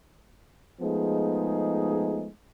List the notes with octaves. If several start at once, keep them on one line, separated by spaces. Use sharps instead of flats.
F3 G#3 A3 B3 D#4 G#4